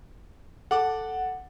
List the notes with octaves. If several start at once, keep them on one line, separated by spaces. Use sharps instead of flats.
A4 F#5 D6